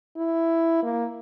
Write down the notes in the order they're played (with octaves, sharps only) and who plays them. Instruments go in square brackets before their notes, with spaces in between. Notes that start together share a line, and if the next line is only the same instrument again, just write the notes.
[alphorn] E4
A#3